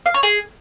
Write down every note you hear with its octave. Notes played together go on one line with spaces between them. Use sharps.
F5
C#5
G#4